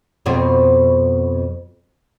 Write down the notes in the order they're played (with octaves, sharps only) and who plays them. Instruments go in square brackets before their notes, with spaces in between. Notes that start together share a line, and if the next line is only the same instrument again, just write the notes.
[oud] F2 B2 C4